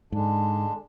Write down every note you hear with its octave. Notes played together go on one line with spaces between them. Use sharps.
G#2 D3 G#3 D4